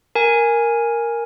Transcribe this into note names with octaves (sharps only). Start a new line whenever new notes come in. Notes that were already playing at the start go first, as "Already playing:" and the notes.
A#4 G#5